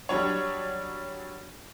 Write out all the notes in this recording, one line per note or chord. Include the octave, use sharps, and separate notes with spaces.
F#3 G3 D4 C#5